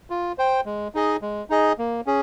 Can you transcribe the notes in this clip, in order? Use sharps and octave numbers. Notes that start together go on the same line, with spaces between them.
F4
C5 G5
G#3
D#4 G#4 D#5
G#3
D#4 G#4 D#5
A#3
C#4 G#4